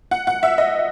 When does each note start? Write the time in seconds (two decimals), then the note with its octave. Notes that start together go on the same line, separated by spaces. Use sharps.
0.11 F#5
0.27 F#5
0.43 E5
0.58 D#5